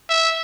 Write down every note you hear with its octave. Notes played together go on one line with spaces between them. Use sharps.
E5